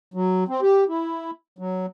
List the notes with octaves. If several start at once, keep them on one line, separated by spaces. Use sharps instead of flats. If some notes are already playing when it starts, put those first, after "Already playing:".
F#3
C4
G4
E4
F#3